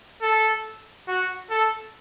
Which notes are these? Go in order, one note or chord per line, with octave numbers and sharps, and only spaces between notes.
A4
F#4
A4